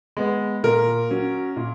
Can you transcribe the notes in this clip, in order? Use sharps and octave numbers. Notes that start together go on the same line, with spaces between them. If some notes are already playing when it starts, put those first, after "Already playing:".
G#3 B3
A#2 A#4
F#3 C#4
A#2